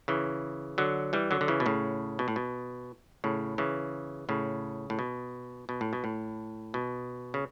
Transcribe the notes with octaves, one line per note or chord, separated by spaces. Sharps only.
C#3 E3
D3 F#3
E3 G3
D3 F#3
D3
C#3 E3
B2
A2 C#3
B2
A2
B2
A2 C#3
C#3 E3
A2 C#3
A2
B2
B2
A2
B2
A2
B2
C#3